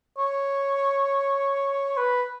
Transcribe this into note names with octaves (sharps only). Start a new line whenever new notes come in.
C#5
B4